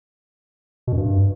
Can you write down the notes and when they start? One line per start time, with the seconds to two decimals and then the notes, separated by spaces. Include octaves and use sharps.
0.87 B2
0.92 F#2
0.97 G2